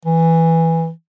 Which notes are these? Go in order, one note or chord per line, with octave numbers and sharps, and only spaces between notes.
E3